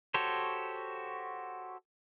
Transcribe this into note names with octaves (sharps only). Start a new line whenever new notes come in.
F#4 G4 A4 C5 C#5